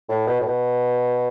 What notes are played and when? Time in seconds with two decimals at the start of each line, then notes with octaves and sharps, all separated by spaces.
0.09 A2
0.27 B2
0.40 A2
0.46 B2